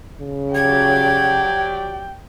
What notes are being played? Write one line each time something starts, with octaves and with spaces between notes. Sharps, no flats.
C#3
F#3 G4 D5 G5 G#6